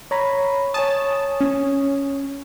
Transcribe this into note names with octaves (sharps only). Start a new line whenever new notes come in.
C#5 A#5 B5
C#5 G#5 A5 D#6
C#4